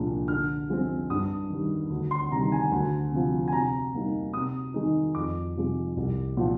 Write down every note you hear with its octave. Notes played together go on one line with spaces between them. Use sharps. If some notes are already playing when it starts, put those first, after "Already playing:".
Already playing: C2 A#2 F3 G#3 D4
D3 F6
F3 G#3 C4
G2 D#6
D#3 G3
D2
C6
C3 D#3 G3 A#5
G#5
D2
C3 F3
G#5
C3 A#5
G3 A#3 D#4
C3 D#6
D#3 G#3 D#4
F2 D6
C3 F3 G#3
C2
A#2 F3